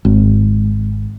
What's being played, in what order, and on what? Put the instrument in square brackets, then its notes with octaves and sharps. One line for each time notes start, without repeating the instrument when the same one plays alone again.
[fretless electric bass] G#1